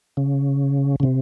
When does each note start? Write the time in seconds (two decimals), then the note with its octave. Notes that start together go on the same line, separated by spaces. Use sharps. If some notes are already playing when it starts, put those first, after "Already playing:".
0.17 C#3
1.00 C#3
1.03 C3